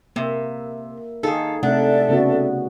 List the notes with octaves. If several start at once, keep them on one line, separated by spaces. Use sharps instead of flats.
C3 A#3 E5
D#3 D#4 G#4 A4 F5
C3 A3 D4 A4 D5 E5 F#5
C#3 B3 F#4